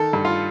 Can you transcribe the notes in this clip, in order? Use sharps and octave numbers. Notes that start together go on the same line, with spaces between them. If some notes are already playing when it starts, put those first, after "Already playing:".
Already playing: D#3 A4
G2
F4